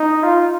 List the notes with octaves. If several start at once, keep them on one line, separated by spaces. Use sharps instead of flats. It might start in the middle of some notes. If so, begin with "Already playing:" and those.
Already playing: D#4
F4